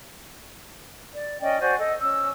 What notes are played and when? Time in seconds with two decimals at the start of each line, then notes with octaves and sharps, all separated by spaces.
1.13 D5
1.40 C#4 D5 D#5 G5
1.60 F#4 C5 D5 G#5
1.78 A4 D#5
2.00 C#4 E6